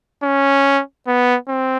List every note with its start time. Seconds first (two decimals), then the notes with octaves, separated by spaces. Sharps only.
0.24 C#4
1.07 B3
1.49 C4